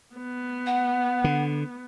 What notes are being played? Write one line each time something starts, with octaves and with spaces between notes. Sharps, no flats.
B3
F#5
D3